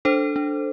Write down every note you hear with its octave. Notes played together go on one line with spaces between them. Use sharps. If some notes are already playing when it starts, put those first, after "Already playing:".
D4 A4 C5
D4